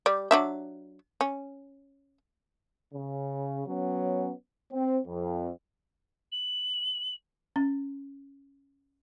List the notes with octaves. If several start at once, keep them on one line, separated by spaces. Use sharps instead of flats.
G3 D5
F#3 D4 E5
C#4
C#3
F#3 B3 C#4
C4
F2
F#7
C#4